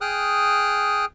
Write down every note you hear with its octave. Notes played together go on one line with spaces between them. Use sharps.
G#4 G5 D#6 F6 F#6